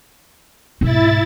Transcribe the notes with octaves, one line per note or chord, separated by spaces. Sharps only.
G#2 B2 E4 A6